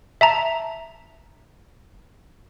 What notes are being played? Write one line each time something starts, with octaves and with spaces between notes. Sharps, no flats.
E5 A5 A#5